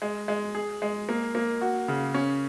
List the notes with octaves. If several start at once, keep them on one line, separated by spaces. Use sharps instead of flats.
G#3
G#3
G#4
G#3
A#3
A#3
F#4
C#3
C#4